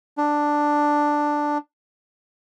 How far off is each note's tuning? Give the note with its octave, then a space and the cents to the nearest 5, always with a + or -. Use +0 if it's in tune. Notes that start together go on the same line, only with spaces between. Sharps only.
D4 +5